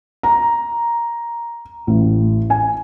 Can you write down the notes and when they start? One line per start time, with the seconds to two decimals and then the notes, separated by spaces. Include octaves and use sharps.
0.23 A#5
1.87 A1
2.50 G#5